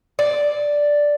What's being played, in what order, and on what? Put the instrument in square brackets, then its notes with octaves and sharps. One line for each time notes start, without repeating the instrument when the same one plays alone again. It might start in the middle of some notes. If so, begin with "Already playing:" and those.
[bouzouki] D5